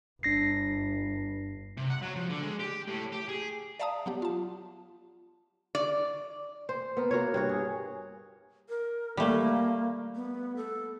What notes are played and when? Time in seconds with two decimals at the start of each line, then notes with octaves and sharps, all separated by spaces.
0.23 G1 D4 A#6 C7
1.77 C3
1.90 F#5
2.02 F#3
2.16 F3
2.30 D3
2.42 G#3
2.59 G4
2.87 A2
3.12 G4
3.28 G#4
3.80 D5 E5 F5 A5 A#5 D#6
4.06 F#3 B3 G4
4.22 F4 A5
5.75 D5
6.69 C5
6.97 B3 A#4
7.11 A#3 F#4 A#4 C#5
7.34 G2 F#4 C#5
7.49 G#4
8.69 A#4
9.17 G3 A3 A#3
10.15 B3
10.56 A4